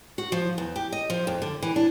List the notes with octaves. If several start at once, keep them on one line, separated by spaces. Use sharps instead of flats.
F#4
F3
E2
G4
D#5
F3
F2
D3
E3
D4